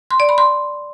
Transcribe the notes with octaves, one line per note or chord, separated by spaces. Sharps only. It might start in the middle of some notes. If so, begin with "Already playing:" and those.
C6
D5
B5
C6